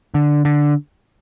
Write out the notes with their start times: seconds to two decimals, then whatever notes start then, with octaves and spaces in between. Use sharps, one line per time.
0.14 D3
0.45 D3